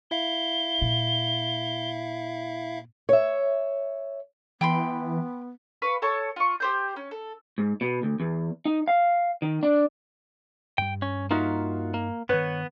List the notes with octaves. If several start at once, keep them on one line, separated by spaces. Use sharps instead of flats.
E4 E5 F5 G7
A#2
C#5 E5
E3 B3 G5 B5 C6
B4 F5 C#6
A4 C#5 A5 C#6
F4 C#6
G4 C5 G6
C#4
A4
G#2
B2
D2
E2
D#4
F5
D#3
D4
G2 G3 G5
C#4
A#3 D#4 F4 F#4 E5
A#3
G2 D#3 B3 B4 C#5